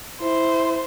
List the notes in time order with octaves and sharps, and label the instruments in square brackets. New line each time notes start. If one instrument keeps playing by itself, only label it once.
[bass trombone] E4 [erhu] C5